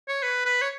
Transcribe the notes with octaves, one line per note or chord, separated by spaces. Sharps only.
C#5
B4
B4
C#5